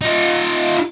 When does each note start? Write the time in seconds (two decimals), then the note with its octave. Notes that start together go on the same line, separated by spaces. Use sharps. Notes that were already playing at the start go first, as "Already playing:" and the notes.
0.02 D#4 F4